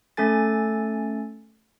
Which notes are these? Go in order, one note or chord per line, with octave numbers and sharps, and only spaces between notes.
A3 C#4 A4 G#5 A6